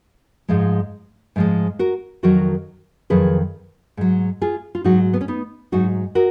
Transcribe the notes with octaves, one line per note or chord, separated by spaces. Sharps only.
G#2 F3 G#3
G#2 F3 G#3
F#4 A#4
F2 D#3 F#3 F#4 A#4
F2 D#3 F#3 G#4 B4
G#2 F#3
F4 G#4
F4
G#2 F#3 D#4 F#4
B3
C#4
B3 D#4
G#2 F#3 D#4 F#4
F#4 A#4